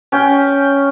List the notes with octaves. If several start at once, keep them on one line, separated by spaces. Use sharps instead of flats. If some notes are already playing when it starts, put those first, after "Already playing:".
C#4 G5